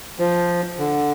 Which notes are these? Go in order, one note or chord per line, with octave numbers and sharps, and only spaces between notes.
F3
D3